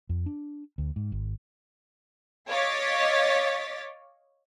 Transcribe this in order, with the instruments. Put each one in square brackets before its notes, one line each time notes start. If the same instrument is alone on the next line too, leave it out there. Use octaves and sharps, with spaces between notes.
[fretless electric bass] F2
D4
D2
G#2
G#1
[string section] C#5 D#5 F5 D6 A6 B6